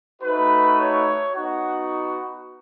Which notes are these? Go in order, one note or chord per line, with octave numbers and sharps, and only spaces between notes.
A3 D#4 F#4 B4
C#5
B3 D#4 F#4